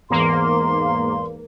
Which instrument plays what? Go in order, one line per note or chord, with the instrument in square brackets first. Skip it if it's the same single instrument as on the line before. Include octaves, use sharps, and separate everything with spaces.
[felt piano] E2 [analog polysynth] G#2 A#3 [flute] C6